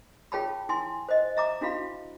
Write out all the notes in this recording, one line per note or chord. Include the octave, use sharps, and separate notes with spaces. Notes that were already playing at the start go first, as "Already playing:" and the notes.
F4 G#4 C#5 G5 A5 B5
E4 G#5 C6
C5 D#5
E5 A#5 D6
D4 E4 F#4 F5 B5